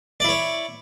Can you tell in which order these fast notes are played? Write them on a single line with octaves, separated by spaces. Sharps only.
D5 E4 C#5